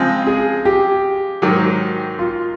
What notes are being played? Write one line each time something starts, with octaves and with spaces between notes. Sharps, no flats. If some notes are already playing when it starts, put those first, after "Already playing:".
Already playing: C#3 F3 G#3 C4
G#4
G4
G#2 D#3 F#3
F4